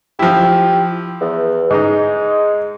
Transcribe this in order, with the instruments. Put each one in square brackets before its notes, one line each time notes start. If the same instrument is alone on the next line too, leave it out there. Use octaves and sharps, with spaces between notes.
[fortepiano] F3 E4 [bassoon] G4
[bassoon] E2
[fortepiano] G#2 D#4 [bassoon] G#3